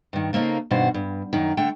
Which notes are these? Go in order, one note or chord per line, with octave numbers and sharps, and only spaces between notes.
G2 D#3
C#3 A#3 C4 D#4 A4
G2 B2 D#3 F#4 C5
G2
F#2 D#3
D3 A3 G5